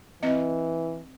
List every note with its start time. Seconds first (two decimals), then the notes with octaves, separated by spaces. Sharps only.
0.23 E3 C4 D#5